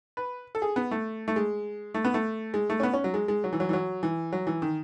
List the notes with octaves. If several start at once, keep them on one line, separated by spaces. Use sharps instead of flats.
B4
A4
G#4
B3
A3
A3
G#3
A3
B3
A3
G#3
A3
C#4
B3
C#4
F#3
G#3
G#3
F#3
E3
F#3
E3
F#3
E3
F#3
E3
D#3